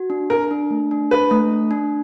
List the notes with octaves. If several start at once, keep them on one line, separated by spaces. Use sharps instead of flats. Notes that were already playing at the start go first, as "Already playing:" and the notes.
Already playing: F#4
D4
D4 A#4
D4
A3
D4
D4 B4
A3
D4
D4